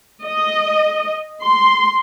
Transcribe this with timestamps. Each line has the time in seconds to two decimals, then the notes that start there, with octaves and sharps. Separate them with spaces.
0.25 D#5
1.44 C6